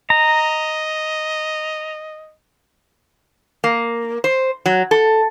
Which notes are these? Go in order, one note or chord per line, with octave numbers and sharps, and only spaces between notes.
D#5 A#5
A#3
C5
F#3
A4